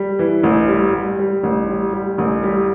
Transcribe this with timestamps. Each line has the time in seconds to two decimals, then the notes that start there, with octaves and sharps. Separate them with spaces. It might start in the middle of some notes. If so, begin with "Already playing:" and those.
Already playing: G3
0.19 E3
0.43 A1
0.68 G3
0.93 G3
1.19 G3
1.43 A1
1.69 G3
1.93 G3
2.18 A1
2.43 G3